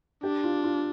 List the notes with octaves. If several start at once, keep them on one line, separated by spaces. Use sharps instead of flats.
D4 G4
F4
F4